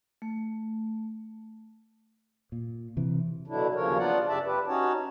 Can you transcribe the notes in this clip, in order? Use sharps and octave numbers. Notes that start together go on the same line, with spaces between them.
A3
A#2
C3 E3
B2 D3 F#3 D4 E4
D#2 C#3 F3 F#3 A#4 C#5
B3 D4 F4 D5 F#5
F#2 C#3 G4 D5 E5 A5
G4 B4
C#4 D#4 F#4 C#5 A5